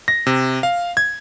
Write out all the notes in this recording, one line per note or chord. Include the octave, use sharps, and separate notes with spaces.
A#6
C3
F5
G#6